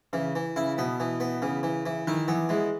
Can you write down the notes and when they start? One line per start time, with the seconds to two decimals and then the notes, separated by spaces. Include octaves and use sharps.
0.13 C#3 E3
0.35 E3
0.56 C#3 E4
0.78 B2 B3
1.00 E3
1.20 B3
1.42 C#3 E3
1.63 E3
1.86 E3
2.07 D#3 E4
2.28 E3 B3
2.49 E3 G#3